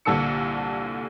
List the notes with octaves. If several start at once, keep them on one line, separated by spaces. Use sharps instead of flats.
C2 A#2 D3 A4 E6 C#7